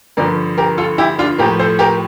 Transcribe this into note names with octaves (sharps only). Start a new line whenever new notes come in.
G2 D3 F3 A#4 D5
G4 A#4
F4 A4
E4 G4
D4 F4
A2 F3 G4 A#4
A4 C5
G4 A#4